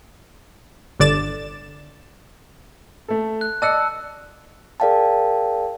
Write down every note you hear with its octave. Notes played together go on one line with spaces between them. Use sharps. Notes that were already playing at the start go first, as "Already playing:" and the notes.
G1 D3 D5 A6 E7
A3 A4
F#6
D5 D#5 A5 E6 F#6 C#7
G#4 A#4 D5 F5 G5 A5